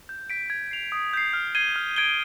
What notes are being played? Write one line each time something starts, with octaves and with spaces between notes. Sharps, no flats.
G6
B6 D7
G#6
C7 F7
D#6
G6 C7
F6
G#6 C7 D#7 G7
F6
G#6 D7 G7